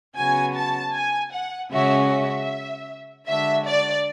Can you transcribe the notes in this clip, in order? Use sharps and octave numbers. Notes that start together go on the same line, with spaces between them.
C#3 F#3 B3 F#4 G#5
A5
G#5
F#5
C#3 G#3 C#4 F#4 E5
E5
D3 G#3 D4 F#4 E5
D5